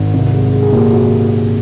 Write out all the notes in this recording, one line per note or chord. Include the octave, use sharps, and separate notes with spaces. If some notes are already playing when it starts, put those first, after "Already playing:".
Already playing: G#1
C2
G#3
G#3
G#4
A#2 G4
F#4